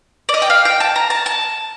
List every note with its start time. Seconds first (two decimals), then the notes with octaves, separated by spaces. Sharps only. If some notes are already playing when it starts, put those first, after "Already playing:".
0.29 D5
0.34 D#5
0.42 G5
0.50 F5
0.65 G5
0.80 A5
0.96 A#5
1.10 A5
1.26 A5